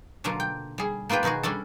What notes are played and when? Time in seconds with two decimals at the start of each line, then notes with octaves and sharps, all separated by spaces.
0.24 B2 D3 F#3 A#3 F4
0.40 G5
0.78 G3 G#4
1.09 A#3 B3 F4 B4 G5
1.23 B2 D#3 D#4 F#4 G#4
1.43 G3 C#4 D4 A4